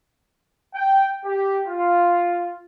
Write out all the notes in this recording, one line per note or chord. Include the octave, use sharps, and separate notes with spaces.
G5
G4
F4